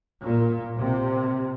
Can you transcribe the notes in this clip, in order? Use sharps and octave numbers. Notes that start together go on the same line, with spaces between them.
A#2
C3